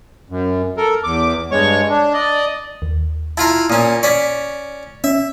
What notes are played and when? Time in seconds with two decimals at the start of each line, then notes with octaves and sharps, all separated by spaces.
0.30 F#2
0.77 A4 A#4
1.04 E2 D6
1.51 G2 G#3 C#5 C#6
1.89 D4
2.14 D5 D#5
2.82 D#2
3.37 E4 F4 F5 A5 A#5
3.70 A#2 C#4 D#6
4.03 C#4 D5 C#6 B6
5.04 C#4 E5